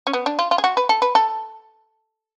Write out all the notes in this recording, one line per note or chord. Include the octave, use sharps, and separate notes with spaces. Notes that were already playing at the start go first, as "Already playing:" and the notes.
C#4
B3
D4
F4
F4
G#4
F#4
B4
A4
B4
A4